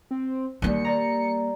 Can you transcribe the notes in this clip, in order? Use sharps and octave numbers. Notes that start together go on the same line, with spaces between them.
C4
D#2 G3 A#3 D#4 C#7
D5 A#5